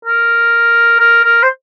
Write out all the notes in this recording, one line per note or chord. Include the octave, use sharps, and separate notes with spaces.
A#4
A#4
A#4
C5